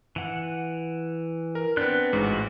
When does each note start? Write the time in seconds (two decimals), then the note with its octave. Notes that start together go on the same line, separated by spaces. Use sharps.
0.16 E3 F#5
1.55 A#4
1.77 B3 C4 D4 B4 F#6
2.13 A1 G#2 F#4